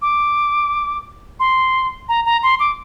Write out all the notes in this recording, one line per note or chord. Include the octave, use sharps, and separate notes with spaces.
D6
C6
A#5
A#5
C6
D6